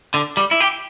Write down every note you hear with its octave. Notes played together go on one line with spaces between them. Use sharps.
D3
G3
E4
G4